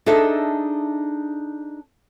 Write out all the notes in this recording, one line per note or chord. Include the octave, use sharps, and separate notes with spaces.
D4 D#4 G#4 A4 D#5 E5